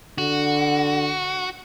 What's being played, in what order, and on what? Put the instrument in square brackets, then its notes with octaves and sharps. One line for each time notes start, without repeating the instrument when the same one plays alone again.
[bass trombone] D3 [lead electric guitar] F#4